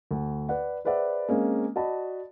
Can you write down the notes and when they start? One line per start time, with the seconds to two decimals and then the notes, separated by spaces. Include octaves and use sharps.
0.11 D2
0.49 B4 D5 F#5
0.85 G#4 B4 C5 D5 E5 F#5
1.28 G#3 A#3 C4 C#4
1.76 F#4 D5 D#5 A5 B5